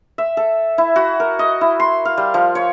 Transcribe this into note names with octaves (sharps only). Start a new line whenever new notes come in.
E5
A4
E4
F#4
A#4
D#5
E4
C6
F5
G3
F3
C#5